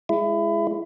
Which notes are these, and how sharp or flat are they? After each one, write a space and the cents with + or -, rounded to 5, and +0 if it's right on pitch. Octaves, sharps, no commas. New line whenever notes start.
G#3 +0 E4 +25